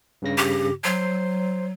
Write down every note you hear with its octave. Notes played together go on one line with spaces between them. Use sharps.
G2 C#3 A#6
G4
F#3 C5 C7